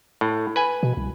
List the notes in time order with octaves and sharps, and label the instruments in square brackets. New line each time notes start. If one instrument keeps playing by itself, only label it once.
[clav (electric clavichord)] A2
B4 G#5
[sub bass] B2
C2